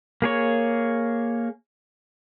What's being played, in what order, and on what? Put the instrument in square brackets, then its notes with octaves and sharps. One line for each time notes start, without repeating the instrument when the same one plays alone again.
[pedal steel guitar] A#3 G#4 C#5